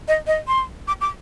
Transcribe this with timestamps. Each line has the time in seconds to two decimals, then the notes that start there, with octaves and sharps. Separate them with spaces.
0.08 D#5
0.27 D#5
0.48 C6
0.88 D6
1.01 D6